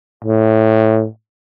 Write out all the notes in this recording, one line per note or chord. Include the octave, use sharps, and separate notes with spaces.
A2